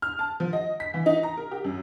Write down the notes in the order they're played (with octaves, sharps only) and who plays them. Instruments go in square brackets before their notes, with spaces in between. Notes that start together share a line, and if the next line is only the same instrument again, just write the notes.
[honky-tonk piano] F6
A5
F3
D#5
B6
E3
D#4
A#5
A#4
G4
F#2